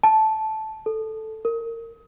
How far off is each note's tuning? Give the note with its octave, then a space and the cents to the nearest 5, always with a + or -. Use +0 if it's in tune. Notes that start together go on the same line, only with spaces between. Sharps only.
A5 -10
A4 +0
A#4 -25